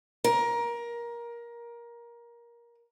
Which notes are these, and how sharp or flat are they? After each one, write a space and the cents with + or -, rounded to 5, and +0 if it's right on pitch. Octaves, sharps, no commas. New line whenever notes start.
A#4 +20